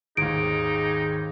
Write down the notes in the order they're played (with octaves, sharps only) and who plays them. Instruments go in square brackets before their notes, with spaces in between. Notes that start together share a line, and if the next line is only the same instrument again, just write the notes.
[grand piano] G#1 D#2 [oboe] D#4 [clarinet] G#4 [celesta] D7